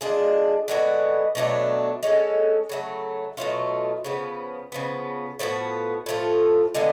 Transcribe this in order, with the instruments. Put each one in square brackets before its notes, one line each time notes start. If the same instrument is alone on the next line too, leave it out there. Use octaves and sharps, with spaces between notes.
[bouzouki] G#3 D4 F4 G#4
D3 G#3 B3 F#4
B2 F#3 A3 D4
G#3 C#4 F4 A4
C#3 F#3 A3
B2 F#3 A3 F4
C#3 F3 B3
C#3 F3 B3
A2 F3 B3 F#4
A2 F3 A3 F4
D3 G#3 B3 F4